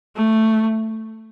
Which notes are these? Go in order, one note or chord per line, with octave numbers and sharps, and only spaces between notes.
A3